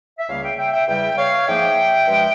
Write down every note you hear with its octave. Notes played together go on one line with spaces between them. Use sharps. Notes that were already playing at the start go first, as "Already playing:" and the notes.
E5
C#2 C#3 G3 A#3 C#5 F5
E5 G5
E5 G5
E5 G5
E2 C#3 G3 E5 G5
C#5 F5
G#2 F3 A#3 E5 G5
G2 F3 G#3